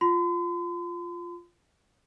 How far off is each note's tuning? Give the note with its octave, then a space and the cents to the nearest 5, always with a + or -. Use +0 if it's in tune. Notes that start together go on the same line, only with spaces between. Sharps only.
F4 +0 C6 -45